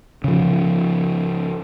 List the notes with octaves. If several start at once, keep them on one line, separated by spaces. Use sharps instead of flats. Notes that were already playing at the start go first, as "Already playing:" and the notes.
C#3 F3